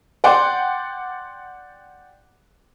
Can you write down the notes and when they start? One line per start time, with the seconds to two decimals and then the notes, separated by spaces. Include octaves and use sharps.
0.24 D5 F#5 G5 C6 D6